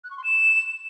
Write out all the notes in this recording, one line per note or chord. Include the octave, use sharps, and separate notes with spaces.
F#6
C#6
C6
E7